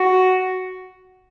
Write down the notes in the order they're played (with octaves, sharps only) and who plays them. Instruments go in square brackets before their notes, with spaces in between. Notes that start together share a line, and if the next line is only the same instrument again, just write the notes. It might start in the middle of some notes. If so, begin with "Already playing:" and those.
Already playing: [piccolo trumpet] F#4